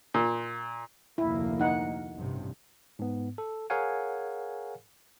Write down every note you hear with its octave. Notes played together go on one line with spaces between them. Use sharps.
A#2
F1 D2 A#3 E4
D#4 F#5
A1 G2 C3
G#2 B3
A4
G#4 A#4 C#5 F5 F#5 G#5